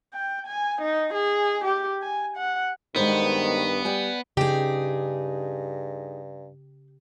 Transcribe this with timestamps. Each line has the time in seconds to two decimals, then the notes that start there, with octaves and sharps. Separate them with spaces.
0.14 G5
0.47 G#5
0.82 D#4
1.14 G#4
1.65 G4
2.02 G#5
2.37 F#5
2.96 G2 D#3 G#3 B3 C5
3.85 G3 D5 G5 G#5
4.37 G2 C#3 D#4 G4 G#4